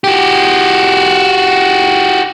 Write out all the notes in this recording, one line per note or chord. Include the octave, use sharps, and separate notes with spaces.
F#4 G4